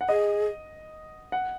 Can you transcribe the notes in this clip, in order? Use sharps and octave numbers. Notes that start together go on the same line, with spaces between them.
F#5
G#4 D#5
F#5